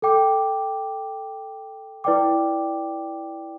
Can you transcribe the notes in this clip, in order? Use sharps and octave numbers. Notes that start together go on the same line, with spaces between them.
A4 G5 D6
E4 B4 D5 G5 D6